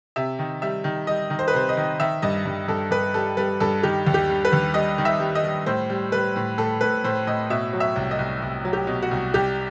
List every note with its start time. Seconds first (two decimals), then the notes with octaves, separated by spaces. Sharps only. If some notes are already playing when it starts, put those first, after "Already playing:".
0.16 C3 E5
0.39 D#3
0.62 G3 E5
0.84 D#3
1.07 G3 D#5
1.30 D#3
1.39 C5
1.48 B4
1.53 C3 C5
1.69 D#5
1.77 D#3
2.00 D#3 E5
2.22 G2 D#5
2.45 G2
2.68 G2 A4
2.91 G2 B4
3.14 G3 A4
3.37 G3 B4
3.60 G2 A4
3.83 D#3 G4
4.06 D#2
4.14 G4
4.29 G3
4.45 B4
4.52 D#2
4.74 G3 D#5
4.98 D#3
5.05 E5
5.20 G3
5.35 D#5
5.44 G3
5.66 A2 C5
5.90 G3
6.12 G3 B4
6.36 A2
6.58 A2 A4
6.81 A2 B4
7.04 A2 C5
7.27 A2 D#5
7.50 B2 E5
7.73 F#3
7.80 E5
7.96 C2
8.11 D#5
8.19 C2
8.42 C2
8.65 F#3
8.73 G4
8.87 B2
9.02 F#4
9.11 C2
9.34 C2 G4